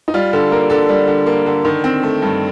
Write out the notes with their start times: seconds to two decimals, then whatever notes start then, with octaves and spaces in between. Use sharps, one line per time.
0.08 D#4
0.14 G3 F4
0.33 D3 A4
0.51 A#3 A#4
0.70 D3 A4
0.89 G3
1.08 D3
1.26 A#3
1.46 D3
1.65 D#3
1.84 C4
2.03 A3
2.22 G2